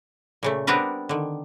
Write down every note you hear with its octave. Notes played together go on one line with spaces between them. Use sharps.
A#2 C#3 A3
G3 B3 C4 D4 A#4 B4
D3 D#3